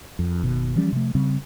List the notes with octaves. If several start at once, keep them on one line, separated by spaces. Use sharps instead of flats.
F2
F#1 B2 D#3
E3 F3 G3 C#4
C3 F3 A3
C#3 G3 C4